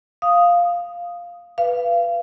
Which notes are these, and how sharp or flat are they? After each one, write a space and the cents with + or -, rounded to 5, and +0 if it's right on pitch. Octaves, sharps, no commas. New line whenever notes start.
F5 +0 D#6 +0
B4 +0 F5 -30